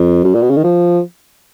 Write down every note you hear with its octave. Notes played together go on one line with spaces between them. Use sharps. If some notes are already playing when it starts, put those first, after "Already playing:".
Already playing: F2
F#2
A#2
B2
C#3
D#3
F3